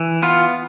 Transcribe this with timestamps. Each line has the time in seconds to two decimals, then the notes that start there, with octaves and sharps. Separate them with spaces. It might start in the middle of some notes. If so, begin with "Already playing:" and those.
Already playing: E3
0.22 B3 F4